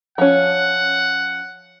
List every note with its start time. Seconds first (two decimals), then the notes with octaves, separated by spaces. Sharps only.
0.18 F3 C#4 F#5